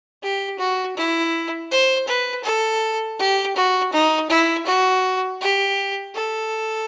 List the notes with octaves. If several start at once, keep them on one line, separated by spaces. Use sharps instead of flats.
G4
F#4
E4
C5
B4
A4
G4
F#4
D#4
E4
F#4
G4
A4